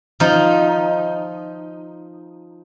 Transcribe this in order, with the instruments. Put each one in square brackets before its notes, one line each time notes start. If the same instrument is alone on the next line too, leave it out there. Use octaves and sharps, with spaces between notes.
[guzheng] F3 D#4